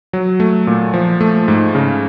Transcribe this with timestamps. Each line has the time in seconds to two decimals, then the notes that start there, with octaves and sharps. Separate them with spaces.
0.13 F#3
0.40 A3
0.67 A#2
0.94 F3
1.21 A3
1.48 G#2
1.75 C#3